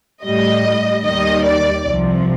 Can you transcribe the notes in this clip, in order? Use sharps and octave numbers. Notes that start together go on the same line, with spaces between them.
A2 G3 D#5
D#2 D#3 G3 D#5
D5
C2 C3 F3